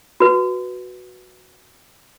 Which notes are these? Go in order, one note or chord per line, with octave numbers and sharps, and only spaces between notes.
F#4 B4